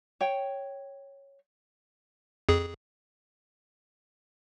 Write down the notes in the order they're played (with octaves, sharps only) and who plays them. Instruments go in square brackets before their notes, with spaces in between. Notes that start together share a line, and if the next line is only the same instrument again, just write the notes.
[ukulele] C#5 G5
[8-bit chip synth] F2 G#4